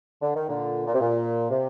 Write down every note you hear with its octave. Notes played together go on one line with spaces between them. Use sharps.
D3
D#3
A#2 D3
A#2
C3
A#2
C3